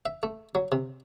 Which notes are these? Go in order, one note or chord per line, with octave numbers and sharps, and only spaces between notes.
E5
A3
F#3
C3